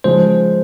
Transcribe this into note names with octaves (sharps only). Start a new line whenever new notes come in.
C#3 F3 G#3 C5